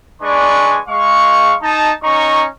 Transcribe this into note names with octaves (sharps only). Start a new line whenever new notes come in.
G#3 D4 B4 D5 G#5 C#6
G#3 F5 C#6
D#4 A5
C#4 D#4 A#5 C#6